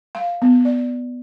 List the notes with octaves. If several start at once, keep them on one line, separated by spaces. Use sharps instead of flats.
F5
B3
D5